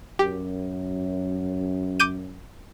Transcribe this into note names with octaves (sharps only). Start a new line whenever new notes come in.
F#2 G4
D6 G6 D#7